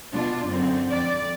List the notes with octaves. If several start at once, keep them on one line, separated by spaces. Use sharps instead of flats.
B2 B3 D4 F4
F#2 D3 C4
F2 D5